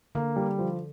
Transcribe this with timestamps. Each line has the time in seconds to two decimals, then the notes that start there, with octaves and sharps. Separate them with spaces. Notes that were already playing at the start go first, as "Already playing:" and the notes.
0.15 D3 A#3
0.36 G3
0.59 F3